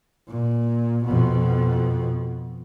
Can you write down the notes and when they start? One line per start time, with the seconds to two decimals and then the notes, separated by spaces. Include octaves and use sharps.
0.28 A#2
1.05 F2 B2